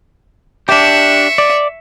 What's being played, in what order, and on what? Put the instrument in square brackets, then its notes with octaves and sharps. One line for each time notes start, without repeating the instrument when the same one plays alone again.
[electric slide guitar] D4 G4 [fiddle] E5 C#6
[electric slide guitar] D5